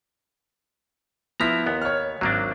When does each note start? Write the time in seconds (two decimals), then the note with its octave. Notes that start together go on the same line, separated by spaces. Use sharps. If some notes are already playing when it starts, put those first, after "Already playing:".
1.40 F3 B3 E4 A#5 B6
1.66 D#2 B3
1.82 C#5 F6
2.21 G#1 F#3 A#3 D4